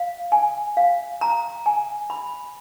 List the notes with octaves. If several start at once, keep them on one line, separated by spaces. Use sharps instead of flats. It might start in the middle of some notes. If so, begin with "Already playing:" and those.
Already playing: F5
G#5
F5
A#5
G#5
B5